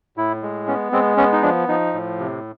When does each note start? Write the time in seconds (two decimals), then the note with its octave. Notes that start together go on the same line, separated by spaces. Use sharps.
0.17 A2 E4
0.43 G#3
0.67 B3 C#4
0.92 G#3 C4
1.17 B3 C#4
1.33 D#4
1.42 F3 D4
1.68 F3 D#4
1.93 A2
2.19 C3